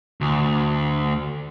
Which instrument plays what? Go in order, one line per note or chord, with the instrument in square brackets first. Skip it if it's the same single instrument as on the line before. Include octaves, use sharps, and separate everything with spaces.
[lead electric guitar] D2